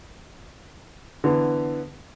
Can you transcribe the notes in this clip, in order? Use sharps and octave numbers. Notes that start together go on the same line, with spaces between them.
D3 E3 B3